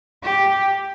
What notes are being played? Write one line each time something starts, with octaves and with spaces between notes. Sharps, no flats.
G4